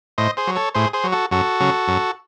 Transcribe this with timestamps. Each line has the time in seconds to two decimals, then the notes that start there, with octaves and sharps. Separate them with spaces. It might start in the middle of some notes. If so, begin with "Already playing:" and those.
0.18 A2 C5 D#5
0.37 G#4 C5
0.47 F#3
0.56 A4 C#5
0.74 A2 G#4 C5
0.93 G#4 C5
1.04 F#3
1.12 F#4 A4
1.31 F#2 F#4 A4
1.60 C#3 F#3
1.88 F#2